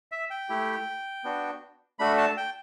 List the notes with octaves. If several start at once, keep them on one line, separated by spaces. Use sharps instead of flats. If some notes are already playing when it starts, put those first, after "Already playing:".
E5
G5
A3 E4 G4
B3 D4 F#4
A3 D4 F#4 B5
A5
G5